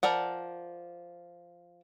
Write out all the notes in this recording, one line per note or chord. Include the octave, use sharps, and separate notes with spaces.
F3 A#4 D5 F#5